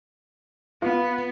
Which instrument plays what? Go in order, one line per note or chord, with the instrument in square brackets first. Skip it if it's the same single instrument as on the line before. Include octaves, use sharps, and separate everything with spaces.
[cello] B3 [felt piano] F4